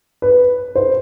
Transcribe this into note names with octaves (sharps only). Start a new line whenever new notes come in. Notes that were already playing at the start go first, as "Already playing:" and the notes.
B4
C5